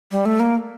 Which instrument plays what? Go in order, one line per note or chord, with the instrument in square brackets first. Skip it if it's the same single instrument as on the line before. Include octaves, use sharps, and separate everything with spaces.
[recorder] G3
A3
A#3